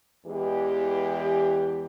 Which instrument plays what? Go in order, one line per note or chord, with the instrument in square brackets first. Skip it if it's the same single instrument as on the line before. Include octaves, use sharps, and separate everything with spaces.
[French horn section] E2 E3 G#3 E4 G4